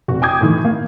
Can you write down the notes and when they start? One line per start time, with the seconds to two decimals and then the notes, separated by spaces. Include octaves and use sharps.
0.08 F1 F#4
0.22 G5 G#5 D6 D#6 G6 G#6
0.41 A2 D#3 E3
0.65 A#3